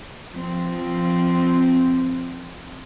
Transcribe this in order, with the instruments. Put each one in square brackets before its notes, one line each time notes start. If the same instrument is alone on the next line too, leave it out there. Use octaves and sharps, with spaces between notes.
[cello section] F3 C4